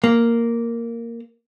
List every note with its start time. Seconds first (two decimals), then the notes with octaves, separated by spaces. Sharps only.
0.04 A#3